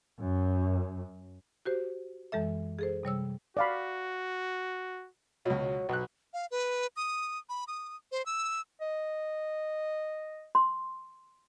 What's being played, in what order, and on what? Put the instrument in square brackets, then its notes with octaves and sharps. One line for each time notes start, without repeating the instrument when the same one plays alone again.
[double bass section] F#2
[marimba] F#4 G4 C5
F#2 E3 G#3 A4 E5
G#4 A4 C5
C3 G3 C#5 E6
[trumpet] F#4 [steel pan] D5 F5 B5
[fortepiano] C#2 B2 [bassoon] F#3
[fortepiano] B1 F#6 [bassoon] B2
[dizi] F5
B4
D#6
B5
D#6
C5
E6
[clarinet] D#5
[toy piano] C6